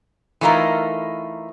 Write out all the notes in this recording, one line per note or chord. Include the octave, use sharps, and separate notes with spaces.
E3 A3 D#4 F4 A#4